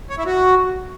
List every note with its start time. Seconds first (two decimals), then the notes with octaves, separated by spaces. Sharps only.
0.10 C#5
0.18 E4
0.26 F#4